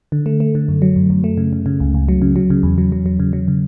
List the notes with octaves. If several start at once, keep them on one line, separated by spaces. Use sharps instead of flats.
D3
A3
A3
D3
F#2
F#3
F#2
F#2
A3
C#3
C#3
C#3
C#2
C#2
F#3
C#3
F#3
C#3
E2
F#3
F#3
F#3
C#3
F#3
C#3